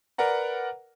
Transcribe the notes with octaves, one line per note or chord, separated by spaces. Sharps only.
A#4 B4 D5 F#5 A#5